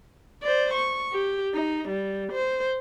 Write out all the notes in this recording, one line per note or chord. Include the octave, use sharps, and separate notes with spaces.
C5 D5
C#6
G4
D#4
G3
C5